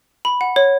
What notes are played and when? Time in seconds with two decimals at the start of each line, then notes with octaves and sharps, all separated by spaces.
0.25 B5
0.41 F#5
0.56 C#5